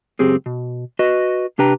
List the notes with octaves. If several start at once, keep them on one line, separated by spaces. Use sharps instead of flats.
C#2 F#2 C4 G4 G#4
B2
F#4 B4 D#5
C3 D4 G4 B4 G5 A#5